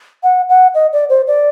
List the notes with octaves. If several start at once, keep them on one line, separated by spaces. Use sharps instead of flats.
F#5
F#5
D#5
D5
C5
D5